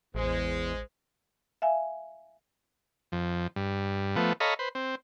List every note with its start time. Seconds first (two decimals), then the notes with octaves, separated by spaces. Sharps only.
0.15 A1 E2 G#3 C5
1.62 E5 F5 G#5
3.12 F2
3.56 G2
4.16 F3 A3 B3
4.40 A4 C#5 D#5 F5 A#5 B5
4.59 B4 C5
4.75 C4